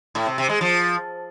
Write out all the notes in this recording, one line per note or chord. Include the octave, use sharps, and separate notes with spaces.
A2
C3
C3
G#3
F3